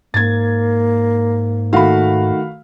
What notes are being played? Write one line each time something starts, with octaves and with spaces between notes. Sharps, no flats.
G#2 A#3 G#6 A6
D#3 A3 F#4 F5 B5